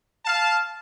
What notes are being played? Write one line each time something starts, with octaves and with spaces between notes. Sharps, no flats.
F5 A5